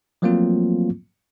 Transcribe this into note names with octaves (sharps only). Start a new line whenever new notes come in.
F3 F#3 A3 A#3 C4 F4